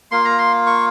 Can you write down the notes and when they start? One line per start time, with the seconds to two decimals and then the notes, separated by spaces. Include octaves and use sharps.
0.11 A#3 F4 C6
0.25 A#5
0.38 C6
0.66 C#6